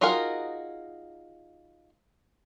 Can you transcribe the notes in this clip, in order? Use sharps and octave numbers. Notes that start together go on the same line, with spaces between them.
D#4 F4 F#4 G#4 A#4